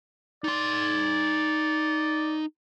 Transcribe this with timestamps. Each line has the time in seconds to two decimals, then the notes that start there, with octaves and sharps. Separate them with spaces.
0.44 D#4 D5 C6